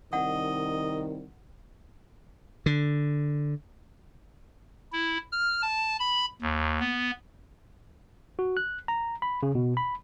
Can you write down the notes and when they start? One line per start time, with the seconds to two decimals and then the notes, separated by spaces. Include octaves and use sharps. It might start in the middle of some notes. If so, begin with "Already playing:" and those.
0.13 C2 D#3 D#5 F#5
2.66 D3
4.93 E4
5.32 F6
5.62 A5
5.99 B5
6.42 D#2
6.80 B3
8.39 F#4
8.57 F#6
8.88 A#5
9.22 B5
9.43 C#3
9.55 B2
9.77 B5